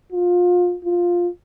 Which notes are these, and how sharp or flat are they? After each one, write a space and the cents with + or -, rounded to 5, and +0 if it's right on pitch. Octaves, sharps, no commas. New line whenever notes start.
F4 +25
F4 +5